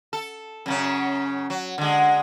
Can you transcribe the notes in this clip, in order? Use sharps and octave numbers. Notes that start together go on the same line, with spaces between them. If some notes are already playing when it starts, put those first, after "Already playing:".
A4
F#2 C#3 C#4
F#3
D3 G#3